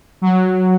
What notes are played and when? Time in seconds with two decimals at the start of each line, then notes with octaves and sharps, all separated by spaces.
0.22 F#3